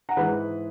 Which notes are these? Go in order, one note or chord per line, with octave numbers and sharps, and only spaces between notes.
F#5 A#5
G#2 E3 G#4 B4